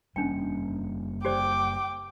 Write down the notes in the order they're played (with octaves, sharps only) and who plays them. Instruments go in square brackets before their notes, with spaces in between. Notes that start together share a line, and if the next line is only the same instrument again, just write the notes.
[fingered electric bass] F#1 G3 A#3 [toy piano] C#4 D4 G5
[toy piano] G4 C5 D5 [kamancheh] G5 D6